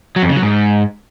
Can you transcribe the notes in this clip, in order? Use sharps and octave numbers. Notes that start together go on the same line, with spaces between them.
F#3
F2
C#3
F#3
G#2